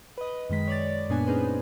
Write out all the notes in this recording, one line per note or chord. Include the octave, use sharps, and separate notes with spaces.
B4 D#5
F#2 D#3 G#3 B6
C#5 D5 A6
F#2 A#2 A#3 B3 D4 G#5
C#4 D#4 G#4 B4 C5